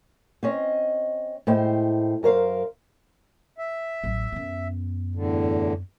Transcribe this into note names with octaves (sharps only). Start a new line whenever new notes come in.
C4 C#4 D#5
A2 G#3 C5 G5
F#2 A#4 C5 F5
E5
A1 F#3
F#2 B3
E2 A2 D3